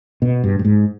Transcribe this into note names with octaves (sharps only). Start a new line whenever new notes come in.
B2
G2
G2
G#2